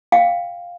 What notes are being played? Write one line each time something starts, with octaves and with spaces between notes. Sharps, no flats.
F5 G5